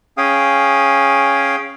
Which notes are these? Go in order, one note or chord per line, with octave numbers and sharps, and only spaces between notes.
C#4 G#4 F5 G5 D#6